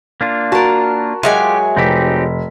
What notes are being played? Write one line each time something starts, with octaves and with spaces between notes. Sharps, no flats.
A#3 D4 F4
F#4 A#4 A5
F#3 G#3 F4 G4 E5 G#5
F1 C4 D#4 G4 B6